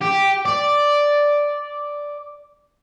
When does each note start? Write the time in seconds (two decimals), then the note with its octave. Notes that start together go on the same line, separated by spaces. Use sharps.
0.02 G4
0.45 D5